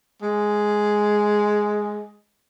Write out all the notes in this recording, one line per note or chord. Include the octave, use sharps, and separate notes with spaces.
G#3